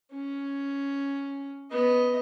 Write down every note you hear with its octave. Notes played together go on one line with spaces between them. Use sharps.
C#4
B3 D#5